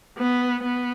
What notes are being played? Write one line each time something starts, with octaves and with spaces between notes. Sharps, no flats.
B3
B3